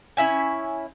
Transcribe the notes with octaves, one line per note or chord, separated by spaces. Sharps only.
C#4 E4 E5 G#5